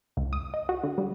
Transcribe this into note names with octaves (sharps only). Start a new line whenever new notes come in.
C#2
D#6
D#5
F#4
D3
G3